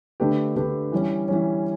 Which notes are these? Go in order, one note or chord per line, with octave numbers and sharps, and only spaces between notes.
D3 A3 D4 G4 B4
D3 A3 D4 G4 B4
E3 G3 C#4
E3 G3 C#4